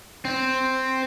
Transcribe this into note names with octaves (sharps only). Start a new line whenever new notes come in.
C4